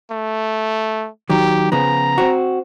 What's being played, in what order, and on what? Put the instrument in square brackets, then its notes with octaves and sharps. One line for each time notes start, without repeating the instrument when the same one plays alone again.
[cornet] A3
[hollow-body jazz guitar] D#3 F#3 [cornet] G4
[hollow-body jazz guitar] C#3 F3 B3 [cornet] A#5
[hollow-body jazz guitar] C4 F#4